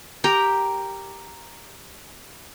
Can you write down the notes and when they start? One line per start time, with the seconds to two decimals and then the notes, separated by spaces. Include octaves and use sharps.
0.24 G4 A#4 G5 A#5